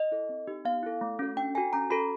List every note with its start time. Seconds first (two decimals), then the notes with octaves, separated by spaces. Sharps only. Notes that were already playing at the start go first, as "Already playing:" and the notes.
Already playing: D#5
0.12 E4 A4
0.29 C4
0.48 D#4 G4
0.65 B3 F5
0.83 E4 A4
1.01 A3
1.19 C#4 F#4 A4
1.37 D4 G5
1.55 F#4 A4 G#5
1.73 C#4 A#5
1.90 F#4 A4 B5